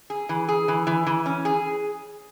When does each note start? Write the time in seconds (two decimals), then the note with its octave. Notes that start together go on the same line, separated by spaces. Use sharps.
0.10 G#4
0.29 E3
0.48 G#4
0.68 E3
0.87 E3
1.06 E3
1.26 C#4
1.45 G#4